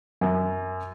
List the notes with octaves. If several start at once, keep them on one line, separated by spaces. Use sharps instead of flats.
F#2